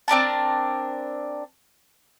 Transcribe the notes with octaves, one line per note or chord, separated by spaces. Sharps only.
C4 D4 A#4 A5